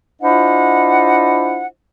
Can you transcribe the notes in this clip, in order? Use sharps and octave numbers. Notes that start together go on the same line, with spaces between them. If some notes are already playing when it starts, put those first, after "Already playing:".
D4 E4 F4 C5 D#5 F#5